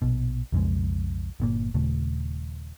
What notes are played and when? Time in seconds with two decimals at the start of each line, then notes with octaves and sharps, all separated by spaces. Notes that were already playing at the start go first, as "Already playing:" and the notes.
0.02 A#1 B2
0.52 B1 F2 C#3 G#3
1.40 G1 A#2 A#3
1.74 D#1 C#3 A3